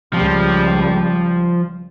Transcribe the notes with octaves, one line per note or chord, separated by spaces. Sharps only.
C#2 F3 G3